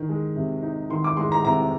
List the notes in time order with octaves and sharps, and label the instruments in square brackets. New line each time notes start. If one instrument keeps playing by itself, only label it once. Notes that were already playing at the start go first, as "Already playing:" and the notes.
Already playing: [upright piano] D#3
G#3
C3
D#4
D#3 C6
D6
G#3 C6
A#5
C3 A#5